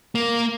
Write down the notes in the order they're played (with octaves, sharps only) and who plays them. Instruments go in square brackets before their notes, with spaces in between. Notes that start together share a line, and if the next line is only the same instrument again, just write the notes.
[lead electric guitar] A#3